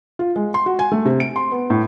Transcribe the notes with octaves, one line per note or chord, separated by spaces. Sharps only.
F4
G#3
C6
F#4
G#5
A3
C3
D7
C6
B3
A2